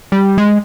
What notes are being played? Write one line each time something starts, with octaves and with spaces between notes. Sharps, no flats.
G3
G#3